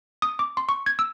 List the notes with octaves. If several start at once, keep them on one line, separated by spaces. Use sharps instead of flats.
D#6
D6
C6
C#6
G#6
E6